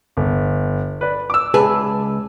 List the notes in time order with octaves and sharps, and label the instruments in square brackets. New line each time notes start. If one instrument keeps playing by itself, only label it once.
[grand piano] G1
B4 D5
D6 E6
[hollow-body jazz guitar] C#2 G#4 B4 [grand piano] A5